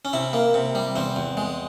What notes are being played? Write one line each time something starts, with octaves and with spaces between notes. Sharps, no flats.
C#4
C3 E4
A#3
C3
G3
E2 C4
E2
G#3